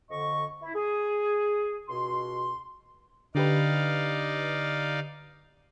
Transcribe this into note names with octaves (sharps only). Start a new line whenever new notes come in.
F2 D3 D#5 C#6
E4
G#4
C#2 B2 F#4 C6
D3 D#4 G4 B4 D5 F5